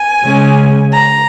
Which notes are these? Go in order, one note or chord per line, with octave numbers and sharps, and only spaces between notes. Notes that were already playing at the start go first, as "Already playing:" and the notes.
Already playing: G#5
C#3 G#3 C#4
A#5